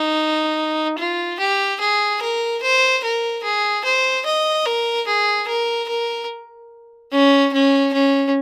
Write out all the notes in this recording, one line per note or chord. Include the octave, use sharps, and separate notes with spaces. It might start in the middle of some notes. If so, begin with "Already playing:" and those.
Already playing: D#4
F4
G4
G#4
A#4
C5
A#4
G#4
C5
D#5
A#4
G#4
A#4
A#4
C#4
C#4
C#4